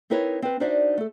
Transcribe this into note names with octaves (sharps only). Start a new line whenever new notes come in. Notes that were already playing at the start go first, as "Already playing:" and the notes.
C4 D#4 E4 A#4 B4 C#5
C4 B4
D4 D#4 F#4 C5 D5 E5
A3 A4